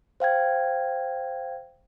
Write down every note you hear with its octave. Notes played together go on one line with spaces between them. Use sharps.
C5 F5 G5 G#6